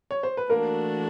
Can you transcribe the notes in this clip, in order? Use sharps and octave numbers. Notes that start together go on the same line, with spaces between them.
C#5
C5
B4
E3 A3 A#3 D4 F#4 A#4